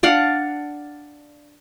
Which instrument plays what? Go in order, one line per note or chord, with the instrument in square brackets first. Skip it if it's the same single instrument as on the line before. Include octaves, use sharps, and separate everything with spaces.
[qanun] D4 D5 F5 F#5